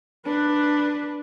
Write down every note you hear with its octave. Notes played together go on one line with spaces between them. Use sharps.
D4 B4